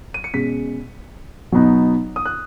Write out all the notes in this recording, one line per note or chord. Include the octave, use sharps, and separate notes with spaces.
D#7
C#7
B2 G#3 C#4 B6
B2 F#3 B3 D#4
D#6
F#6